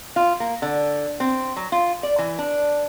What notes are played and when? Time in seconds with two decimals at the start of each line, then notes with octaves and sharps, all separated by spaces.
0.16 F4
0.40 A#3
0.62 D3
1.20 C4
1.57 F#3
1.72 F4
2.03 D5
2.18 E3
2.39 D4